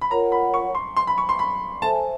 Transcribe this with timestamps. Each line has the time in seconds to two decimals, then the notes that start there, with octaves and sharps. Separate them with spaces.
0.01 B5
0.11 F4 A#4 C#5 F#5 A#5
0.32 B5
0.54 C#6
0.75 C6
0.97 C6
1.07 B5
1.18 C#6
1.29 C6
1.39 B5
1.82 A4 C5 E5 G#5 A5